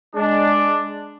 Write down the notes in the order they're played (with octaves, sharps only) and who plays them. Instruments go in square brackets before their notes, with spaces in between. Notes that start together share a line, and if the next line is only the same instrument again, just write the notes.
[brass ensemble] G#3 D4